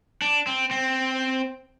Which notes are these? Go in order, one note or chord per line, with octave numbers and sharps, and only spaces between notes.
D4
C4
C4